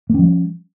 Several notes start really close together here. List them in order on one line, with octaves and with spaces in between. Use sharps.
A#3 C#4 F3 G3